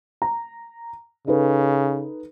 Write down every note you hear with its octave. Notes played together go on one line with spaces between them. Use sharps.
A#5
C#3 D#4 A4 B4